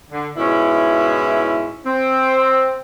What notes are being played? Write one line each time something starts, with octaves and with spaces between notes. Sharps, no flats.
D3
G#2 B2 C#4 E4
C4